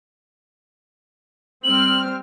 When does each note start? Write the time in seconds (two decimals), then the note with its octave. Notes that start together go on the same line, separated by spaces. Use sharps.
1.64 G3 C4 F6 F#7